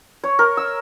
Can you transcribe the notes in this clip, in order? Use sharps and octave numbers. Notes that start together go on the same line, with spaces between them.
C#5
A#4
E6